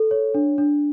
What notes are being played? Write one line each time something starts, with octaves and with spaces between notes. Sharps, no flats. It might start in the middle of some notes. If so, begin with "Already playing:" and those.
Already playing: A4
C#5
D4
D4